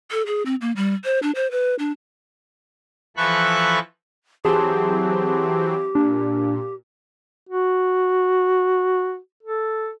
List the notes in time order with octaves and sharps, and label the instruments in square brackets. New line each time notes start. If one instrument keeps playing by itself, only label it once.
[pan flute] A4
G#4
C4
A#3
G3
C5
D4
C5
B4
D4
[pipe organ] E3 F3 A4 B5 C#6 F#6
[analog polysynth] E3 F#3 C4 [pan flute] G4 [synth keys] G#4 A5 C6
[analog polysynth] A#2 [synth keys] D4
[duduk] F#4
A4